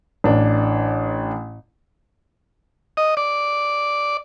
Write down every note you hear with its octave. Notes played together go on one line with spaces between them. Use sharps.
A1 D4
D#5
D5